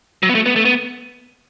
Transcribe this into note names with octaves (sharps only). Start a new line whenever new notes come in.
F#3
B3
A3
B3
A3
B3